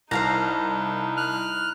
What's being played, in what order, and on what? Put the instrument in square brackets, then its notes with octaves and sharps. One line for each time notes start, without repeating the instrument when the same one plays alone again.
[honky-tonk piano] C2 [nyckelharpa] D#4 E4 [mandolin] C5 F5 A#5
[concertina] F6 F#6